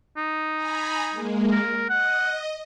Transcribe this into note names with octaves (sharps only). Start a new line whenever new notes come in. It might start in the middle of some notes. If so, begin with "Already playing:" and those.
D#4
G#5 A#5 B5
G#3 A#3
A#4
D#5 F#5